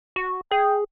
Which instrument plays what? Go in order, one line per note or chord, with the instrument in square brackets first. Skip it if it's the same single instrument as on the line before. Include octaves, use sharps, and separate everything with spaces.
[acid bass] F#4
[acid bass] G#4 [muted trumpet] G5